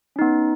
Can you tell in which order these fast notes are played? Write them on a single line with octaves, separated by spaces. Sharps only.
C#4 D#4 B3